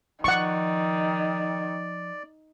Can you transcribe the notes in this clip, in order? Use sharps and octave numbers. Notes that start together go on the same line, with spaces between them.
D#3 F3 D5 F#5 C#6